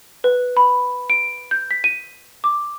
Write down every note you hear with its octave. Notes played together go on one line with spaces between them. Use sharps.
B4
B5
D7
G6
B6
D#7
D6